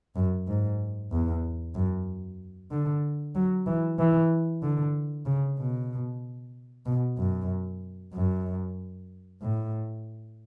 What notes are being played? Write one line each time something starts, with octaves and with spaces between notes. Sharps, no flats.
F#2
G#2
E2
F#2
D3
F#3
E3
E3
D3
C#3
B2
B2
F#2
F#2
A2